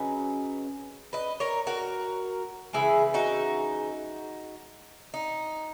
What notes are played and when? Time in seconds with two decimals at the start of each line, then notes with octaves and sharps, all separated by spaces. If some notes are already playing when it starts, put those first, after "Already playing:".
Already playing: C#3 F#3 C#4 B4 D#5
1.13 B4 D#5
1.40 A#4 C#5
1.67 F#4 A#4
2.73 C#3 E3 G#3 E4 G#4
3.14 D#4 F#4
5.14 D#4